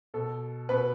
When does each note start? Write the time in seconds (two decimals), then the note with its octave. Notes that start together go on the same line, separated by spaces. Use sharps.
0.14 B2 A4
0.69 B2 B4